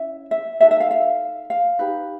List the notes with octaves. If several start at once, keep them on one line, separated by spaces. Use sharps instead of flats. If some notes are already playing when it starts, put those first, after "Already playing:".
Already playing: C#4 E4 E5
E5
D#4 F#4 A4 E5
E5
F5
F5
F5
D#4 G4 B4